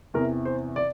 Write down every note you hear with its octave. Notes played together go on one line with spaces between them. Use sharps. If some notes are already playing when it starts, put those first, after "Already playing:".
E2 C3 E3 A#4
C5
D5